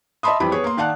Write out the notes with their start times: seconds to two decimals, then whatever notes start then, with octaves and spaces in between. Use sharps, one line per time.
0.23 D#5 E5 A5 B5 C6 D#6
0.40 F2 E3 G3 G4 B5
0.52 B3 G#4 C#5
0.64 A#3 C6
0.77 D#3 D5 F5 F#5 A5 F#6